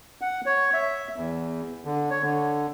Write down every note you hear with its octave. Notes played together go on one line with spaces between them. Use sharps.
F#5
C#5
E5
E2
D3
C#5
D3